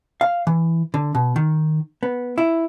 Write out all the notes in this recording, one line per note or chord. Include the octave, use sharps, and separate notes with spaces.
F5
E3
D3
B2
D#3
B3
E4